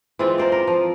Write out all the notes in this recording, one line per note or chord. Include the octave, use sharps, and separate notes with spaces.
E3 G#3 C4 F4
A#4 C5 D5
A#4
F3